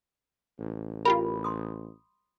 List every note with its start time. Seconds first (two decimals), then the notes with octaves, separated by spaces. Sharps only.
0.59 A1
1.05 F4 G4 A#4 B5
1.44 C6 D#6